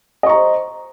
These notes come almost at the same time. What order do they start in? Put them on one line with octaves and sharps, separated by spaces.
D#5 C#6 A#5 C5